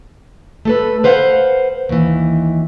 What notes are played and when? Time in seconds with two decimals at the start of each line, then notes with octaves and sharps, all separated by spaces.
0.65 A3 A4 B4
1.04 B4 C5 F5 F#5
1.89 D#2 E3